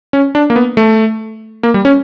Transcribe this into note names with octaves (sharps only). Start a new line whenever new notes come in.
C#4
D4
A#3
B3
A3
A#3
G3
C#4